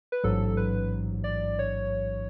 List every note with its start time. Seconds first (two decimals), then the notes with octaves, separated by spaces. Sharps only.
0.12 B4
0.24 A1 G#2 F#3 A4
0.57 B4
1.24 D5
1.59 C#5